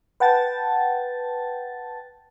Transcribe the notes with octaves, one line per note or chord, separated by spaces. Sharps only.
B4 F#5 G5 A5 A6